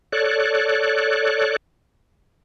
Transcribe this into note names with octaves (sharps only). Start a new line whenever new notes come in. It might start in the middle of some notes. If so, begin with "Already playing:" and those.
A4 C#5 D5 F#6